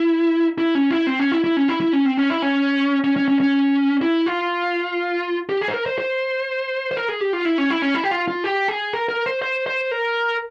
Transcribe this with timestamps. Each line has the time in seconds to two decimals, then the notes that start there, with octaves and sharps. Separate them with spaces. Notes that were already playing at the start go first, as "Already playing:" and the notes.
Already playing: E4
0.58 E4
0.75 C#4
0.91 E4
1.07 C4
1.20 C#4
1.32 E4
1.44 E4
1.57 C#4
1.69 E4
1.81 E4
1.93 C#4
2.05 C4
2.17 C#4
2.30 E4
2.42 C#4
3.04 C#4
3.16 C#4
3.28 C#4
3.40 C#4
4.02 E4
4.26 F4
5.49 G4
5.61 G#4
5.68 C5
5.74 A#4
5.86 C5
5.99 C5
6.91 C5
6.96 A#4
7.09 G#4
7.21 G4
7.33 F4
7.45 E4
7.58 C#4
7.70 E4
7.82 C#4
7.95 E4
8.04 G4
8.11 F4
8.28 F4
8.44 G4
8.68 G#4
8.93 A#4
9.09 A#4
9.26 C5
9.42 C5
9.66 C5
9.91 A#4